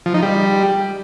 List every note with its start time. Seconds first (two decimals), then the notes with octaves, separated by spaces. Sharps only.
0.06 F3
0.14 D#4
0.22 G3